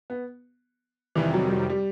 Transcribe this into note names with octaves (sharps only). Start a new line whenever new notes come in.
B3
F2 C3 D#3 E3 G3
F#3
F#3
G3